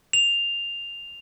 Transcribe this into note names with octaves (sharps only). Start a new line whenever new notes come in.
F7